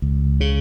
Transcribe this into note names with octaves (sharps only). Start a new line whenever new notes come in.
C#2
C#3